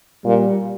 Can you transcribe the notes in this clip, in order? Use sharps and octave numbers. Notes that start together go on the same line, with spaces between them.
A#2 G3